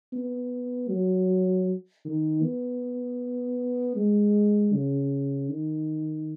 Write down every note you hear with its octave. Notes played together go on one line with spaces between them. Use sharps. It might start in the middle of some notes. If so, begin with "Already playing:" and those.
B3
F#3
D#3
B3
G#3
C#3
D#3